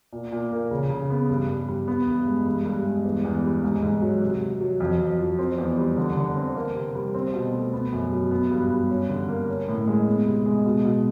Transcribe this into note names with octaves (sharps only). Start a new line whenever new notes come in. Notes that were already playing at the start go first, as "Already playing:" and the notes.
A#2
A#2
A#3
C#3
C#3
B3
G2
G2
G3
B3
G2
G#3
G2
G2
G#3
E2
E2
G3
G#2
G#2
F#3
C3
C3
F#3
F2
F2
F3
C4
E2
G3
D3
D3
C4
A#3
C3
G3
C4
B2
A3
B3
F#2
F#3
B3
G2
G3
C#4
D3
A#3
C#4
A2
G#3
B3
C3
G#3
B2
B2